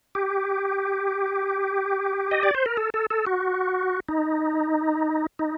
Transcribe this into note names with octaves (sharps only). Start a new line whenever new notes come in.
G4
D#5
D5
C5
A#4
A4
A4
A4
F#4
D#4
D#4